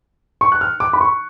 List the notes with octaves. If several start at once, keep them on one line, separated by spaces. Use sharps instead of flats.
C#6
F#6
F6
D6
B5
C#6